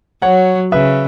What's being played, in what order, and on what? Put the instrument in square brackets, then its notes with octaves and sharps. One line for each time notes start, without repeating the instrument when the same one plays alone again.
[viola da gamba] F#3 [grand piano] C#5 F#5
[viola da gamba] C#3 [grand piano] B4 E5